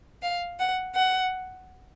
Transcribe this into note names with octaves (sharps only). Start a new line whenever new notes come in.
F5
F#5
F#5